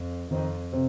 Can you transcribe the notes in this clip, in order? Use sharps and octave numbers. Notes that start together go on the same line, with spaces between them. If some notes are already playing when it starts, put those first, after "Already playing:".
Already playing: F2
F2 D#3 C4 D#4
C3 C4